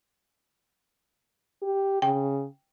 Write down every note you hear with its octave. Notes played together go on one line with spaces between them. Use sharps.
G4
C#3 G5